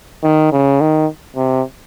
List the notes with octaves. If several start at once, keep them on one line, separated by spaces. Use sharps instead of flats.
D#3
C#3
D#3
C3